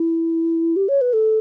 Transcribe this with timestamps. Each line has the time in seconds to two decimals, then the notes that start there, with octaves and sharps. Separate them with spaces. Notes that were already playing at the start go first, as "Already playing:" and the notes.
Already playing: E4
0.76 G4
0.89 C#5
1.01 B4
1.13 A4